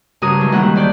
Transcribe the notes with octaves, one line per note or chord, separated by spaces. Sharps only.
G2 C#3 F#4 A#4 D#6
D#3 E3 F#3 G#3
D#3 E3 G3 A#3 F#5 F#6
D2 E3 D5 F#6 G6